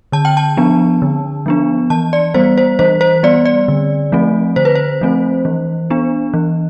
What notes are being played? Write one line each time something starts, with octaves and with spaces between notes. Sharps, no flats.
D3 A5
G5
A5
F3 B3 D4
D3
F3 B3 D4
E3 A5
D5
G3 B3 C5
C5
E3 C5
C5
G3 B3 D5
D5
D3
F3 A3 C4
D3 C5
B4
C5
F3 A3 C4
E3
B3 D4
E3